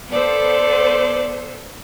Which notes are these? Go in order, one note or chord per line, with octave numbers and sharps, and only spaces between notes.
B3 A4 C5 D5